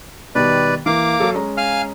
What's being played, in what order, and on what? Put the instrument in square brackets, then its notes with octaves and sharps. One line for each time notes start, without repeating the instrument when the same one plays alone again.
[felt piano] B2 D#3 G3 [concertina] B4 D5
[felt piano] E3 [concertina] A#3 F5 D6
[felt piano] F#3 A4
G#3 C#4 A#5
[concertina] F5 G#5 F6